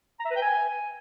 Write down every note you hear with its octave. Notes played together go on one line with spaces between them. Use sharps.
A#5
E5
B4
G5
G#5